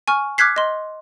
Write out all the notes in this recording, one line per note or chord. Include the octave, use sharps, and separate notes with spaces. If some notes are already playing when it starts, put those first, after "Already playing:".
G#5 C#6 F6
D6 F6 F#6 G#6 B6 C7
D#5 C6